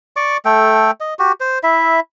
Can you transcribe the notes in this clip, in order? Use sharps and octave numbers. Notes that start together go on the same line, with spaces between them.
D5 C#6 D6
A3 A4 G5
D#5
F#4 G4
C5
E4 E5